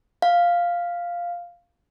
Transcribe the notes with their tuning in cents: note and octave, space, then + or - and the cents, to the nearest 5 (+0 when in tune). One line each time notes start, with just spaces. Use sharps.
F5 +0